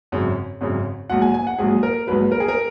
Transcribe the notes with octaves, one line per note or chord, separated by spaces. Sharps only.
G#1 F#2 C#3
G#1 F#2 C#3
A#1 G#2 F#3 F#5
G#5
G#5
F#5
A#1 G#2 F#3 G#4
A#4
A#1 G#2 F#3 B4
A#4
G#4
A#4